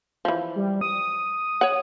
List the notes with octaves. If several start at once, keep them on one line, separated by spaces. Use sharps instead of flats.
E3 F3
G3
D#6
C#5 F#5